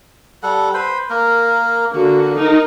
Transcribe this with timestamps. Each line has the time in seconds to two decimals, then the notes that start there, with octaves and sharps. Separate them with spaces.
0.43 G3 A4 F#5
0.74 B4 C5
1.10 A#3 A#4
1.93 D3 A#3 F#4
2.35 D#4 A#4